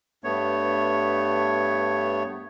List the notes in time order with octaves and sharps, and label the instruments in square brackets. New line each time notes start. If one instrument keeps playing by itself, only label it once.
[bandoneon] G2 A3 B3 C#5